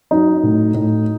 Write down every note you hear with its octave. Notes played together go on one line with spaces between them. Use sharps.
F#3 D#4
A2
A2